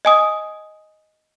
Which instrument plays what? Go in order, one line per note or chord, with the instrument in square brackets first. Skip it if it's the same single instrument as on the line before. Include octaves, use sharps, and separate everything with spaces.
[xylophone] D#5 G#5 D#6